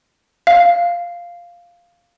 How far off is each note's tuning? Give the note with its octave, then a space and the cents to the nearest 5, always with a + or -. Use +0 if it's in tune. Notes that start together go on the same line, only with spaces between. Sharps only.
F5 -5